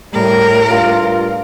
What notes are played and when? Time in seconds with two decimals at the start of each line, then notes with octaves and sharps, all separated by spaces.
0.13 A2 G3 A#4
0.70 G2 F4